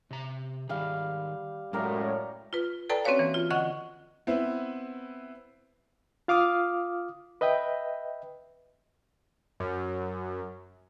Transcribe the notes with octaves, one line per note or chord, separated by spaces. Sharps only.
C3 A#5
D#3 G3 G#4 F5
F#2 A2 G#3 G4 A#4 D5
F4 B4
A4 B4 D5 G5 A5 A#5
C4 C#4 F#4 B4 C#5 F5
E3 A#3
F4
D3 D#5 F#5 C#6
B3 C4 E4 B4
F4 F5 D6 D#6 F6
B4 D#5 E5 G5
F#2